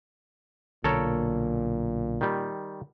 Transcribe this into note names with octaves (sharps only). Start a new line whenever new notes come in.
B1 A#2 D3 A#3 A4 A#4 C#5
D#3 G3